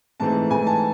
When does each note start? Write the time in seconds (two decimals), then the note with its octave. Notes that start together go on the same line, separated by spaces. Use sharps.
0.20 G#2 E3 A3 C4 A5
0.50 G#2 E3 A3 C4 G#5
0.67 A5